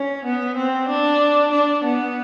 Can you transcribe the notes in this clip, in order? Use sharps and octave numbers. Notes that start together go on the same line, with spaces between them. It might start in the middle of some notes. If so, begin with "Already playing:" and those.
Already playing: C#4
B3
C4
D4
D4
B3